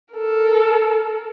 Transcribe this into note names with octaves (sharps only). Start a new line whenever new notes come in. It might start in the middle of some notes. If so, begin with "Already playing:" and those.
A4 A#4